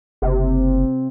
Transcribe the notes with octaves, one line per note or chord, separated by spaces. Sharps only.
F#1 C3